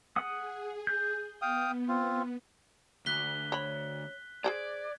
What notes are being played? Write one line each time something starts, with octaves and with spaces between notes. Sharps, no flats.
G#4 F#5 D#6
G6
B3 F5 G5 D#6
C4 F4
D2 F#6 B6 G7
C#5 B5
G#4 A4 C5 D5 G#6